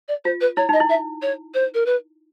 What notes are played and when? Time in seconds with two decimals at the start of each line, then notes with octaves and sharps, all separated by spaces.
0.08 D5
0.25 F4 C5
0.41 B4
0.57 E4 C#5
0.69 D#4 D#5
0.80 E4
0.89 E5
1.22 C#5
1.54 C5
1.74 A#4
1.86 B4